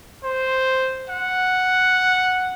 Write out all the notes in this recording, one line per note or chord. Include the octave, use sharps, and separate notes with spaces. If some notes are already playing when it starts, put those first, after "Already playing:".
C5
F#5